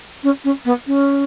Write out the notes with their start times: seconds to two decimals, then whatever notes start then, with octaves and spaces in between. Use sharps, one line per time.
0.23 C#4
0.44 C#4
0.65 B3
0.86 C#4